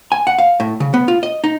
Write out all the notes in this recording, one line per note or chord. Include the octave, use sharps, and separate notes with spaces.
G#5
F#5
F5
A2
C#3
B3
F4
D#5
D#4